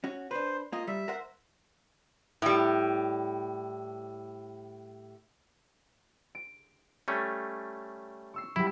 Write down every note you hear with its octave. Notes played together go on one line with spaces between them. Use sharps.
C#4 F#4
D4 B4 C5
A#3 F4 A#4 D#5
G3 E5
A#4 C5 F#5
A2 G3
D7
G3 A3 C#4
C#6 E6 C7
F#3 G3 E4